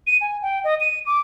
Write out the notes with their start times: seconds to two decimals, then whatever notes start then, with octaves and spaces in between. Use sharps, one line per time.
0.07 D#7
0.21 G#5
0.42 G5
0.64 D#5
0.80 D#7
1.06 D6